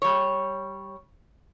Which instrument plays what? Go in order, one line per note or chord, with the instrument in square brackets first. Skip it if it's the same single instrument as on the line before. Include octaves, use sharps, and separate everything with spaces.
[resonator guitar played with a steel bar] G3 C#5